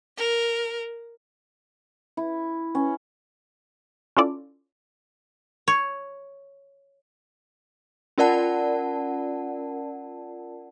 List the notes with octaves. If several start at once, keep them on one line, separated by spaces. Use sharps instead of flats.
A#4
E4
C#4
C#4 E4 F4 A4 D5
C#5
C#4 F4 A#4 D5 F#5 A5